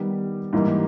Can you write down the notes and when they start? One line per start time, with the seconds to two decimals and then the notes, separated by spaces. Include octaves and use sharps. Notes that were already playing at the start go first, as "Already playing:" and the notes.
Already playing: D#3 G3 B3
0.53 G#2 E3 G3 A#3 D#4